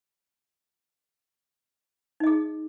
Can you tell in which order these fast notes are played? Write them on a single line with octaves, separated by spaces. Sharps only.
D#4 D#5 G#4